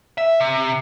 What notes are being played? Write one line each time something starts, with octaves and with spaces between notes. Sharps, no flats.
E5
C3